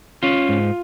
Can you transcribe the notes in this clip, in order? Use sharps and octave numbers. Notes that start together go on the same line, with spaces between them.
C#4 F4
G#2